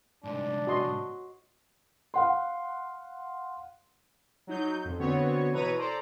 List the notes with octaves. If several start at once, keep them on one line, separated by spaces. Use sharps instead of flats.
C2 G#2 D4
F#4 D#5 C6
F5 F#5 C6
F#3 D#4 G6
F2
D3 B3 C4 F#4 C#5
B2 E3 B4 C#5 A#5 D#7
A4 C5 D5 A#5